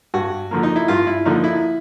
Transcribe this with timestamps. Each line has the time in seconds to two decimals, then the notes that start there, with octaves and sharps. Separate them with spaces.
0.14 G2 F#4
0.51 D3 F3 A#3
0.63 D#4
0.76 E4
0.88 G2 F4
1.07 E4
1.25 D3 F3 A#3 D#4
1.44 E4